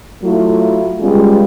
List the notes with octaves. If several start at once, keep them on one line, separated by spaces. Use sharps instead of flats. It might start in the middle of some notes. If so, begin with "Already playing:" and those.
F#3 A3 E4 F4
G3 G#3 B3 C#4 F4